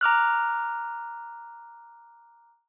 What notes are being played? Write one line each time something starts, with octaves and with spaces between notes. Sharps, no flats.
A#5 D6 F6 F#6